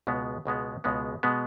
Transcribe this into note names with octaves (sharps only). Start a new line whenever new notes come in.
C#2 B2 G#3 B3
C#2 B2 G#3 B3
C#2 B2 G#3 B3
B2 G#3 B3